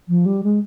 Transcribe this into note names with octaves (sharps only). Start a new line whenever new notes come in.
F3
G3
G#3